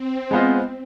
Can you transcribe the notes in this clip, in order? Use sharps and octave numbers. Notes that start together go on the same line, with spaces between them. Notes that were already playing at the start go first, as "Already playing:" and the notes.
Already playing: C4
G#3 B3 F4 C5 D#5